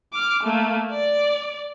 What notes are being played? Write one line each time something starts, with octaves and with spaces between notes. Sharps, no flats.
D6 F6
A3 A#3
D5